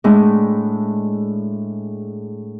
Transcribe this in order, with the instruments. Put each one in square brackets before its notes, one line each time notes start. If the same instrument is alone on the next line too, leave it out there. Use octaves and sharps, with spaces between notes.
[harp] A2 G#3 A3 D4